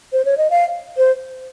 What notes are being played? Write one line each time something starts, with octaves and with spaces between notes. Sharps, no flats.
C5
C#5
D#5
F5
C5